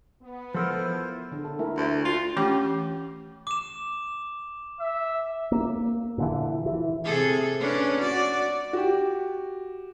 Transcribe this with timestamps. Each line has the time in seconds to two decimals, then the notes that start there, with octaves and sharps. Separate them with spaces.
0.23 B3
0.54 F3 E4 F4 A4 A#4 C5
1.32 D3
1.45 A4
1.59 A3 E4 A#4
1.77 D2
2.05 F4
2.37 E3 A3 C#4 G4 G5 D6
3.47 D6 E7
4.80 E5
5.52 A#3
6.18 A#2 D3 E3
6.66 E3
7.05 C3 G#4 A4
7.60 C#4 D4 B4
8.01 F#4 D5
8.73 F#4 G4